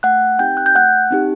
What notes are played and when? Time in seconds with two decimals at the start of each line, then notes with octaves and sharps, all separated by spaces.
0.03 A3 F#5 F#6
0.39 C4 D#4 G4 G5 G6
0.57 F#6
0.66 G6
0.75 A3 F#5 F#6
1.11 C4 D#4 G4